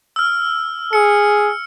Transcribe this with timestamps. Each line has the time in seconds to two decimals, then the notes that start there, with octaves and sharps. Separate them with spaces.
0.16 E6 F6
0.93 G#4 C#7